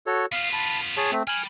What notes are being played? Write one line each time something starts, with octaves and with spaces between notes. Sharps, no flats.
F#4 A4 C#5
B3 F4 F5
A5 B5
G#4 C#5 A5
A3 C4
G5 G#5 B5 F6